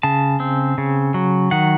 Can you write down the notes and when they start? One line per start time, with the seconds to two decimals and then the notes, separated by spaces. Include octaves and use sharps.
0.03 C#3 A5
0.40 C4
0.78 C#3
1.14 F#3
1.51 D#3 F#5